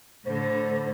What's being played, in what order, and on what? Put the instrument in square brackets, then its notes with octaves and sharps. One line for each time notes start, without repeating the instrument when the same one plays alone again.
[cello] A2 D3 [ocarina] C5